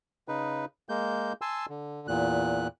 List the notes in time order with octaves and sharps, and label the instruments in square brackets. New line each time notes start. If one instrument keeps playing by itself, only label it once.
[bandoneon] C#3 D#4 B4
G#3 A#3 G6
G#5 A5 C6 E6
D3
E2 A#2 F#6